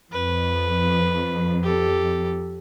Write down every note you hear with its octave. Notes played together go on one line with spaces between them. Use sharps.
F2 B4
G4 A4